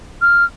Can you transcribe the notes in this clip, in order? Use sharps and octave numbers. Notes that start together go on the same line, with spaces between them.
F6